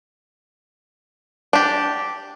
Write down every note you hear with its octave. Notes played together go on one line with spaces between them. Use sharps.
D4 G4